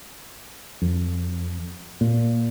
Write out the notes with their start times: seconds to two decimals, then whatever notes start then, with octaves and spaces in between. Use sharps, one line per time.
0.82 F2
2.01 A#2